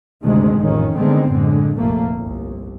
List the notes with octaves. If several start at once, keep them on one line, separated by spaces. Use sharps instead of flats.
D2 G2 C3 D#3 G#3 A3
A1 F2 G#2 D#3 C#4
D3 D#3 G#3 A3 B3 C4
F#2 A2 D3 G#3
F1 A#1 A#2 A3 A#3
G1 C2